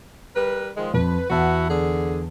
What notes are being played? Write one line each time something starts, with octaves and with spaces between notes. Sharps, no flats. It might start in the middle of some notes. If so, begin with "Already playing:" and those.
G3 A#4 B4
D#3 F3 G#3
F2 B4
E2 B3 E4 F#4 A5
D3 G#4